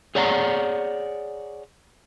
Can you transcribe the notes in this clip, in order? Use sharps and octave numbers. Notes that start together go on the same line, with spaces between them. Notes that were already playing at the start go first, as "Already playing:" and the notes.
G#4 C#5 D5 F#5 A#5